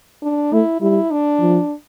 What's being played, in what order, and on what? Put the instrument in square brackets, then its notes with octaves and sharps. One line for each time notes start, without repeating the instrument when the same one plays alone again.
[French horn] D4
[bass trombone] A3 [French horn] E4
[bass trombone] G3 [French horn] E4
[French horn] D4
[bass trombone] F3